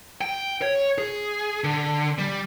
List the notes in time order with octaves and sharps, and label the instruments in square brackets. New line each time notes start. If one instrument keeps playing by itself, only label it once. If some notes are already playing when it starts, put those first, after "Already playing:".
[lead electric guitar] G5
C#5
G#4
D3
G3